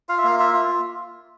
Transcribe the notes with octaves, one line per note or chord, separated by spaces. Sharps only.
F4 F5
E5
A#3 F5
F4 E5
F4